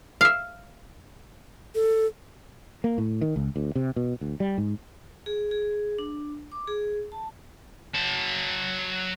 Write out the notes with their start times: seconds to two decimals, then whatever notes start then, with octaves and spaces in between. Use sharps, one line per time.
0.21 E5 F5
1.75 A4
2.84 A#3
2.98 A2
3.21 D#3
3.36 C#2
3.56 D2
3.75 C3
3.96 B2
4.21 D2
4.40 G3
4.58 G#2
5.26 G#4
5.51 G#4
5.99 D4
6.52 D6
6.68 G#4
7.12 A5
7.94 F#3 A5